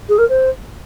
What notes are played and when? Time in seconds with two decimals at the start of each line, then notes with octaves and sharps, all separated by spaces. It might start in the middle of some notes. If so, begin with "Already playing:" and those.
0.09 G#4
0.18 A#4
0.29 C5